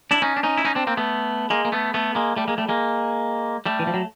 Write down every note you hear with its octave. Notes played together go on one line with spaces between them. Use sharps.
D4 E4
C#4 D#4
D4
C#4 D#4
E4
C#4 D#4
C4 D4
A#3 C4
A3 B3
G#3 A#3
A#3
A3 B3
A3 B3
G#3 A#3
G3 A3
G#3 A#3
G3 A3
G#3 A#3
G3 A3
E3
F3
F#3